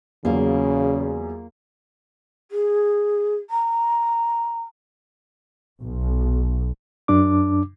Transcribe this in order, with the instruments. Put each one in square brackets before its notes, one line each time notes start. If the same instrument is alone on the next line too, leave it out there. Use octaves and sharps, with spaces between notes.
[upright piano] E2 F#3 [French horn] C#3 [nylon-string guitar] A#3 F4 F5
[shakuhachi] G#4
A#5
[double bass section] B1
[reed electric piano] F#2 D4 D6